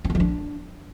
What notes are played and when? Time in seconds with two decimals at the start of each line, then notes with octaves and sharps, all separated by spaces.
0.05 C4
0.10 B3
0.15 F3
0.20 D4